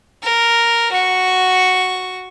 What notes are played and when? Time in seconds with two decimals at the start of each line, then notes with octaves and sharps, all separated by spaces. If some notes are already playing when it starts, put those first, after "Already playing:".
0.23 A#4
0.92 F#4 C#6